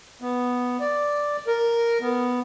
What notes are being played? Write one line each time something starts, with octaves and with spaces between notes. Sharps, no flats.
B3
D5
A#4
B3